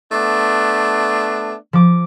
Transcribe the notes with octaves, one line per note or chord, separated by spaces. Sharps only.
A3 B3 D4
F3 D6